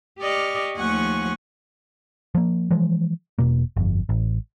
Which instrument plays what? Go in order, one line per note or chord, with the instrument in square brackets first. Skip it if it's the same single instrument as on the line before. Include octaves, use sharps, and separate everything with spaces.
[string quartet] G4 D5 D#5 C#6 F6
D#2 F3 A3 F#5 G#5 C#6
[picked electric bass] F3 A#3
E3 F3 G#3
E1 B2 A#3
G1 F2
A1